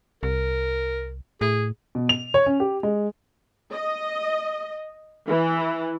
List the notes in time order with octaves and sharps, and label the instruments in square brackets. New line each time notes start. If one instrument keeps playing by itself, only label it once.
[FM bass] C2 [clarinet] A#4
[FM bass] A2 [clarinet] G#4
[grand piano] B2
F7
C#5
C#4
G4
G#3
[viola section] D#5
E3